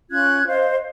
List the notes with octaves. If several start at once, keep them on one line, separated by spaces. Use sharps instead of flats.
C#4 F4 F#6 G#6
C5 D#5 F5